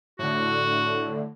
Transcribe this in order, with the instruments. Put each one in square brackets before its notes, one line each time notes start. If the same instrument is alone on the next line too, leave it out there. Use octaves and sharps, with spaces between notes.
[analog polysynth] A2 D3 [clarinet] F#4